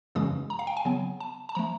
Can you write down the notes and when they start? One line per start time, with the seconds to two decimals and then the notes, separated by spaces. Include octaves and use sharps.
0.15 F#2 C#3 E3 G#3 C#4 D#6
0.50 A#5
0.59 F5
0.67 G5
0.77 G#5
0.85 C#3 F#3 B3
1.20 A5
1.49 A5
1.55 F3 A3 A#5